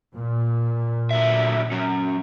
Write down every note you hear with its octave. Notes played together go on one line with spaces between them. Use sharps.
A#2
D3 F#3 E5
F#3 C#4